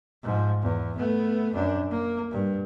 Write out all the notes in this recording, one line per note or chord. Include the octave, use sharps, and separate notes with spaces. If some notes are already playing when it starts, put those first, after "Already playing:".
G#2 F3
E2
A3 B3
F#2 D4
A#3
G2